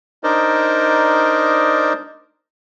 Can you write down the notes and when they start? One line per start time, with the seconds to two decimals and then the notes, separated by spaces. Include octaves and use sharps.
0.24 D4 D#4 A#4 C5 D5 D#5